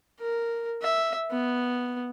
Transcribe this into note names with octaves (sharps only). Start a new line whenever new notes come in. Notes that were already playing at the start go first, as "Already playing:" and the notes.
A#4
E5
B3